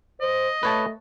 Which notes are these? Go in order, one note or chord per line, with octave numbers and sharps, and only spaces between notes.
C5 D#5
A3 B4 C#5 A5